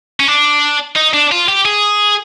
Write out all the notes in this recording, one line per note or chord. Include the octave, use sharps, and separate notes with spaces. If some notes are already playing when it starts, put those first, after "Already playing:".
C#4
D4
D#4
D4
F4
G4
G#4